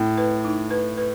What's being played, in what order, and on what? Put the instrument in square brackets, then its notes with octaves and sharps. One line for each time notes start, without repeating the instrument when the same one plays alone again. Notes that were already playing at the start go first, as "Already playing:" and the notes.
Already playing: [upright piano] A2
[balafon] B4
D#4
B4
B4